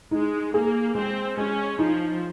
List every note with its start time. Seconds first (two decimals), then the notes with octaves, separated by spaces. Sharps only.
0.11 G#3 D#4
0.53 A#3 G#4
0.95 G#3 C4
1.37 G#3 C#4
1.79 F3 D#4